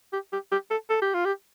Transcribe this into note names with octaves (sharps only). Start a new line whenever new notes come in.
G4
G4
G4
A4
A4
G4
F4
G4